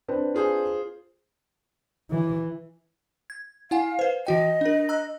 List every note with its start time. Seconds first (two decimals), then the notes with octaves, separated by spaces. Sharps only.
0.08 C4 D4 B4
0.34 F4 G#4 C5
2.10 E3
3.30 G#6
3.71 E4 F5 F#5 G#5
3.99 B4 C5
4.27 E3 F#4 D#5 G5
4.61 D4 A#4
4.89 A#5 E6 F#6